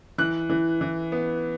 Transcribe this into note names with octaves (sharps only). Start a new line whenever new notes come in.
E3 F#6
E3
E3
B3